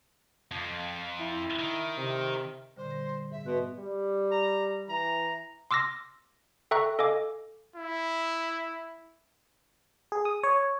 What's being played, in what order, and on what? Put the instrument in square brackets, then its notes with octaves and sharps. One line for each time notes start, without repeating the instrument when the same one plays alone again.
[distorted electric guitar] F2 F3
[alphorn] E4
[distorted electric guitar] D#3
[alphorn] C3
[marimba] A#2 D3 G3 [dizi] C5
[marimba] A#6
[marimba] G#2 [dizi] E5
[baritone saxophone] B2 [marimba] C6 F#6
[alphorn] G3
[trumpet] A#5
[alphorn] E3 [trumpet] A#5
[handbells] C6 D6 E6 F6 A#6
A4 E5 G5 A#5 C#6 F#6
A4 D#5 F5 G#5 D6
[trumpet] E4
[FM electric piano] G#4
D#6
C#5